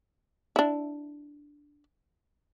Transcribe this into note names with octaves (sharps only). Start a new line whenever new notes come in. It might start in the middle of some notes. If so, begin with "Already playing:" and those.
D4 E4